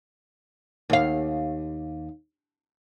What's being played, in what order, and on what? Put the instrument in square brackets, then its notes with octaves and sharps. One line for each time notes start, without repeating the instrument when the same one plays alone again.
[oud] D#2 F5